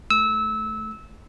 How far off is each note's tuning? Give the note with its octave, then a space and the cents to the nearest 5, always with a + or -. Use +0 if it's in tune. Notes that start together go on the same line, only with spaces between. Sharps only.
A3 -15 E6 -20